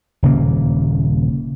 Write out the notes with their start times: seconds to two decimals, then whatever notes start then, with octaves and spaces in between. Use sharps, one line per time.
0.23 D#1 C#3 A#3